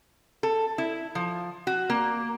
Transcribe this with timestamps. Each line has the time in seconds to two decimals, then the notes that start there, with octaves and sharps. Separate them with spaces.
0.43 A4
0.78 E4
1.15 F3
1.67 F#4
1.90 A#3